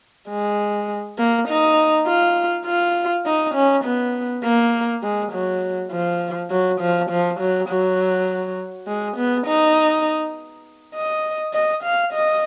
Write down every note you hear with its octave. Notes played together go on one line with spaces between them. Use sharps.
G#3
A#3
D#4
F4
F4
D#4
C#4
B3
A#3
G#3
F#3
F3
F#3
F3
F3
F#3
F#3
G#3
B3
D#4
D#5
D#5
F5
D#5